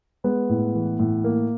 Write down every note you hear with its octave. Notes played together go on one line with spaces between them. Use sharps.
G#3 B3 B4
A2
E3
A2
A#3 A#4